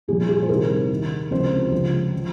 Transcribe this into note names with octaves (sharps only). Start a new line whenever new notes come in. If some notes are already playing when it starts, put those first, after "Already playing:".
C2 A#2 F3 G#4
G#4
C5
C2 C3 D#3 A#4
D#2 D#3
C#2 C3 F3 C5
C#2 C#3 F3
F3